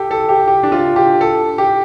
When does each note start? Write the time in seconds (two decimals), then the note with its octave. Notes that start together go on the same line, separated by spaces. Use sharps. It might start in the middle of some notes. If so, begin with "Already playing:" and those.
Already playing: G4 A4
0.11 A4
0.29 G4
0.48 G4
0.63 D4
0.72 F4
0.96 G4
1.21 A4
1.58 G4